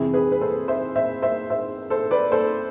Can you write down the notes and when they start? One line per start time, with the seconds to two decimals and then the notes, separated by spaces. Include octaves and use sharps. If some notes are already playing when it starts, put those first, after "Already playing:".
Already playing: F2 C3 E3 E4 G#4
0.13 G#4 B4
0.32 B4
0.41 A4 C5
0.68 C5 E5
0.96 C5 E5
1.22 C5 E5
1.50 C5 E5
1.90 A4 C5
2.11 B4 D5
2.32 A4 C5